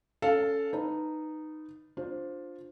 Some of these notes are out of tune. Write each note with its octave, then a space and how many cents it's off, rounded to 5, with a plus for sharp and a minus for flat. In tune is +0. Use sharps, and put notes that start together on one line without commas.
C#4 +15 A4 +0 F5 +5
D#4 -10 B4 +0
D4 +0 F4 +10 C5 +0